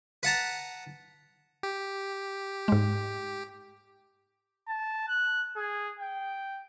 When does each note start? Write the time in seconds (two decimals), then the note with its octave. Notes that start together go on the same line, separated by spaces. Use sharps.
0.23 B4 F#5 A5 A#5
1.63 G4
2.68 G#2 G#3
4.68 A5
5.08 F#6
5.56 G#4
5.99 G5